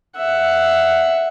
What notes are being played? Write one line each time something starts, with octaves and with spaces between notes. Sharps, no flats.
E5 F#5